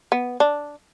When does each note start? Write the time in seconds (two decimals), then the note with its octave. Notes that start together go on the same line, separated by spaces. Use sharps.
0.12 B3
0.40 D4